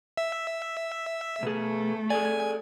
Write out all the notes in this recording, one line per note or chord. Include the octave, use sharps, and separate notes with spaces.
E5
B2 A3 G#4
G#4 A4 D5 G#5